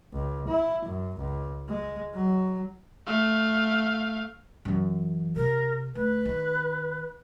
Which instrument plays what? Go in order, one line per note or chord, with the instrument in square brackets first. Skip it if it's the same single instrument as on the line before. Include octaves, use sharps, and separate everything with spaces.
[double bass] C#2
E4
F#2
C#2
G#3
F#3
[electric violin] A3 F5
[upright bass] F#2 E3
[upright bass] C3 [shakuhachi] A#4
[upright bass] D2 [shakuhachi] B4
[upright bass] D#3